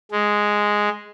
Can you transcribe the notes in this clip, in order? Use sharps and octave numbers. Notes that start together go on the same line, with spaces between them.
G#3